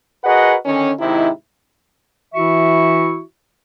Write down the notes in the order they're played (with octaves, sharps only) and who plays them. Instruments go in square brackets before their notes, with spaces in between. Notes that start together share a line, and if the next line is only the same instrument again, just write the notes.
[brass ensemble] F#4 G#4 A#4 B4 D#5 F#5
D3 D#3 C#4
G#2 C3 D#3 D#4 E4
[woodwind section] E3 E4 F#4 E5 C#6